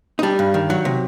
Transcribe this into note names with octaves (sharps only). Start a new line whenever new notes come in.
D#4
G3 D4
G2
D#3
F#3
C3